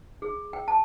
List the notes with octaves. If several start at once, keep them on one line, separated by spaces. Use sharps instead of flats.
G#4
G5
A5